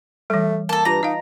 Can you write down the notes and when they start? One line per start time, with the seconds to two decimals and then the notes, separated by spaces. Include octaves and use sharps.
0.30 E3 G3 A3
0.69 A#3 A4 A5
0.85 G2 F4 B4 A#5
1.03 D#4 D#5 F5